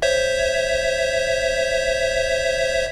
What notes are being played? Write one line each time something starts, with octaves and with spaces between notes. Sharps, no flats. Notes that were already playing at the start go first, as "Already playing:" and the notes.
C5 C#5 E5